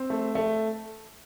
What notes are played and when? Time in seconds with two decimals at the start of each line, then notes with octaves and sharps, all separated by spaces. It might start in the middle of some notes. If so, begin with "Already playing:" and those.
Already playing: C4
0.10 A3
0.35 A3